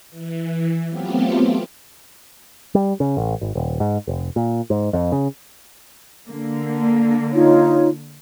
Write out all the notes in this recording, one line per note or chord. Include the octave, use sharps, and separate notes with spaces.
E3
F#3 A3 B3 C4 F4 G4
G3
C#3
A1
G#1
D#1
G#2
F1
A#2
G#2
F2
C#3
D3 A#3
D#4 F4 C#5